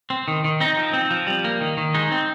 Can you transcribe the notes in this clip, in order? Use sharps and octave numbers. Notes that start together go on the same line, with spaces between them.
C4
D#3
D#3
C4 D#4
F3
C4
F3
G3
A#3
D#3
D#3
G#3 D#4
C4